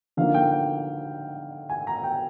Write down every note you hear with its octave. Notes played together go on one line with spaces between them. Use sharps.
D3 F3 A#3 D#4 F5
G5
G5
G#5
A#5
G5